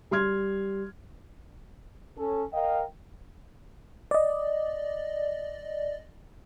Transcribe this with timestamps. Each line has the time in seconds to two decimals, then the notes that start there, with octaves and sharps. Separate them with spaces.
0.11 G3 C6 F6 G#6
2.18 C#4 A4
2.53 A#4 D#5 F5 G5
4.11 D5 D#5